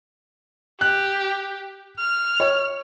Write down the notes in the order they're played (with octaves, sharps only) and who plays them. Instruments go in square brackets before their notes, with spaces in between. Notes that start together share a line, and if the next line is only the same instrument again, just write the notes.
[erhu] G4 [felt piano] F#6
[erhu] F6
[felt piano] C#5